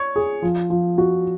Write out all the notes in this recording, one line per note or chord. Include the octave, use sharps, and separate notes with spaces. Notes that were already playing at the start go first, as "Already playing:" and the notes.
Already playing: C#5
G#4
F3
F3
F#4